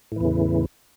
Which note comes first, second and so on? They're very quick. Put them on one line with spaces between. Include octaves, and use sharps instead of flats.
A2 E3 E2 C#3